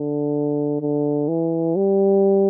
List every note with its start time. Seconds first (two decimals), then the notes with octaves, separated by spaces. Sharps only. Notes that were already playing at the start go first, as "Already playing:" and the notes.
Already playing: D3
0.81 D3
1.28 E3
1.76 G3